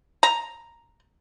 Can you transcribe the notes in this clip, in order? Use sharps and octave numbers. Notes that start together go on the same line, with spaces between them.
A#5